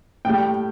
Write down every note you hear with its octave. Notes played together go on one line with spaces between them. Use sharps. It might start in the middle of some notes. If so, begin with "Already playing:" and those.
A2 G3 G5